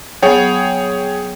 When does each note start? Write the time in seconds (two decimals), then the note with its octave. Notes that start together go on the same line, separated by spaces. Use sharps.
0.23 F#3 B3 G#4 C#5 G5